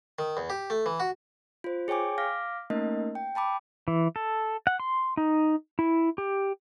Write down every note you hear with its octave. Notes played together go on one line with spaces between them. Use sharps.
D#3
E2
G4
A3
E3
F#4
F4 C5
G#4 C#5 G5 G#5 D6
F5 D6 F6 A#6
A3 A#3 C#4 D#4 A#4 D#5
G5
G5 A5 B5 D6
E3
A4
F#5
C6
D#4
E4
G4